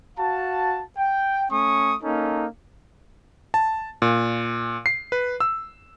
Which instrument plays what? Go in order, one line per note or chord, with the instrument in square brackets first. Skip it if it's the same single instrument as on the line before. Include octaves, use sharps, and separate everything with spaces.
[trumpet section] F#4 F5 A5
G5
A3 C#4 C#6 D#6
A#3 C#4 D#4 A4
[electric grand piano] A5
A#2
C7
B4
E6